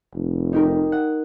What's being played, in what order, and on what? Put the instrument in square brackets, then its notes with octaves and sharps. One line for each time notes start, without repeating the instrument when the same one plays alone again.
[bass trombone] F1
[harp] D#4 G4 A#4
F#5